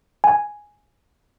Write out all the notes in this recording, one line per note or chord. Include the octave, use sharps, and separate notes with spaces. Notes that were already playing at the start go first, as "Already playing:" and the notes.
G#5